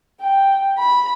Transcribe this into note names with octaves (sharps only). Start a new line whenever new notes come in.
G5
B5